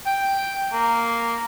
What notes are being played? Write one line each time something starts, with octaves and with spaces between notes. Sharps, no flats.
G5
A#3